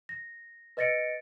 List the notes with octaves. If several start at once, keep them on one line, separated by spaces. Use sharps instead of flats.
A#6
B4 D#5 A6 A#6 C#7 D7